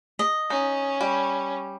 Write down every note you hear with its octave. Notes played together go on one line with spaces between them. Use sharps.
D#5
C#4 D#4
G3